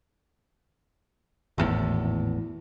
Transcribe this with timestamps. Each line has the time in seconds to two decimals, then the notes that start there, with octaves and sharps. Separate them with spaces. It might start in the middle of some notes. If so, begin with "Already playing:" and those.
1.58 G#1 E2 A2